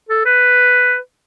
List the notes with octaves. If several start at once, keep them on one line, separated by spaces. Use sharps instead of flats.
A4
B4